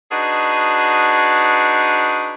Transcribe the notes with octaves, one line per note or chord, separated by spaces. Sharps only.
D4 D#4 F#4 G#4 B4